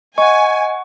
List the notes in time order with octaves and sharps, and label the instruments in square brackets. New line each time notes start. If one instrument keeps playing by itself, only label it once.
[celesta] D#5 [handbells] F#5 C#6 [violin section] G#5